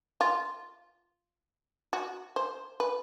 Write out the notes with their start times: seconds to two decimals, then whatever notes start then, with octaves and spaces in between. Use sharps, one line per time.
0.21 F4
1.93 F#4
2.36 C5
2.80 B4